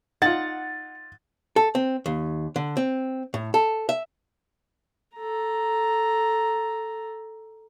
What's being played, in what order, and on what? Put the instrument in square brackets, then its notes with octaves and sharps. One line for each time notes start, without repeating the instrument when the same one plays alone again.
[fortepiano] D#4 F4 [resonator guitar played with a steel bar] F#5 [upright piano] A6
[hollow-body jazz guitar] A4
C4
D#2
D3
C4
A2
A4
E5
[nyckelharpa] A4 A#5